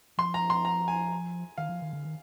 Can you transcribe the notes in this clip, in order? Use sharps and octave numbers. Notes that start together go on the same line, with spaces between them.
F3 C6
A#5
C6
A#5
G#5
D#3 F5
F3
D#3
D3
D#3